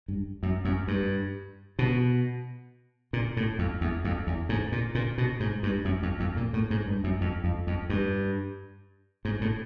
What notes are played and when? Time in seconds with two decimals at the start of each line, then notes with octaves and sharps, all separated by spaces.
0.08 G2
0.43 F#2
0.65 F#2
0.88 G2
1.79 B2
3.13 A#2
3.37 A2
3.59 F2
3.81 E2
4.04 F2
4.27 E2
4.49 G#2
4.72 A#2
4.95 A#2
5.18 B2
5.40 G#2
5.63 G2
5.85 F#2
6.03 F2
6.20 F2
6.37 A#2
6.53 A2
6.70 G#2
6.87 G2
7.04 F#2
7.21 F2
7.44 F2
7.67 F2
7.90 G2
9.25 G#2
9.41 A2